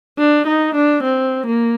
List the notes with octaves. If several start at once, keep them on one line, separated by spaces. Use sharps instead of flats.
D4
D#4
D4
C4
A#3